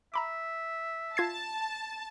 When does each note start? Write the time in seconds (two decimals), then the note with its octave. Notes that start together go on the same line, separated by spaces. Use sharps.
0.14 E5 A#5 B5 D6
1.17 F4 A5 G#6 C7